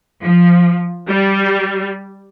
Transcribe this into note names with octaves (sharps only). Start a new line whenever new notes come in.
F3
G3